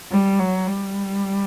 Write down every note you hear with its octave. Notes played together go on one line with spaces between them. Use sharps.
G3
F#3
G3